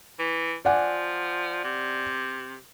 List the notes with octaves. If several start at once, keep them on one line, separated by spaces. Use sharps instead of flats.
E3
F3 D5 F#5 G#5
C3